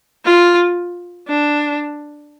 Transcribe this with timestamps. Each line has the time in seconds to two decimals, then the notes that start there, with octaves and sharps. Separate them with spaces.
0.25 F4
1.28 D4